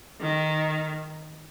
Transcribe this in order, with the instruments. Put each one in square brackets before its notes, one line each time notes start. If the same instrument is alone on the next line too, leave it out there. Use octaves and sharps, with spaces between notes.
[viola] D#3